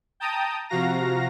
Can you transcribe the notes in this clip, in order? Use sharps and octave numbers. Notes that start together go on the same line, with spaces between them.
G5 A5 A#5 D#6
C3 F3 F#4 F5 A#5 A#6